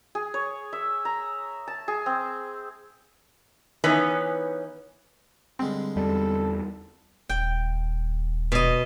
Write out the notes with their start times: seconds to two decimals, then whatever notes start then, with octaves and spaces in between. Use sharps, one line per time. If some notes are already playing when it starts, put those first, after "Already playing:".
0.15 G#4
0.34 C#5
0.73 E5
1.05 A#5
1.67 A5
1.88 G#4
2.06 C4
3.84 E3 B3 C#4 D#4 B4
5.59 G2 D3 G#3 C4
5.96 E2 G3 A4
7.29 D#1 G5
8.52 B2 D#5